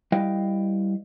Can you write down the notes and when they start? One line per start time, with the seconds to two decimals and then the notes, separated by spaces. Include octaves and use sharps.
0.12 G3 E4 B4 D#5 F5 G5